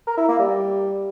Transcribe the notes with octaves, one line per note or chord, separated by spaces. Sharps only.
A#4
E4
A#3
G3